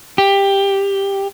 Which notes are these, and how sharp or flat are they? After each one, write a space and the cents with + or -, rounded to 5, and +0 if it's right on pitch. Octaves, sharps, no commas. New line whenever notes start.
G4 +10